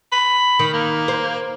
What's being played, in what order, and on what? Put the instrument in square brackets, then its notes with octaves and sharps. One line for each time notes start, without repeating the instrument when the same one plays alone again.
[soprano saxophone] B5
[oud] D#3
[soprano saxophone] A#3
[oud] C5